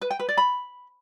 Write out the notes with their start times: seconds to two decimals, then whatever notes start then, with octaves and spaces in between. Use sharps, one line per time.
0.01 B4
0.10 G5
0.19 B4
0.28 D5
0.37 B5